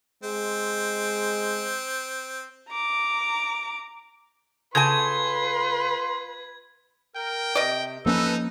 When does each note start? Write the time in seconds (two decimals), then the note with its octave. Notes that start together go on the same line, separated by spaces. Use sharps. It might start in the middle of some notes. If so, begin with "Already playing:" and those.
0.23 G#3 C4
2.69 A#5 D6
4.75 C#3 F4 A4 B4 G#5 C6 G#6
7.16 A#4 G5
7.55 C3 D5 D#5
8.06 F3 A#3 C#4 D#4 A4 B4 E6